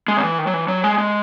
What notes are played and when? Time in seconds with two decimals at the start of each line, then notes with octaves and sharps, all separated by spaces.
0.08 G#3
0.17 D#3
0.23 E3
0.39 D#3
0.47 F#3
0.54 E3
0.68 F#3
0.84 G#3
0.98 G#3